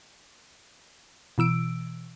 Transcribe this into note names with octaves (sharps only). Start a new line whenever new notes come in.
B2 E3 E6 D7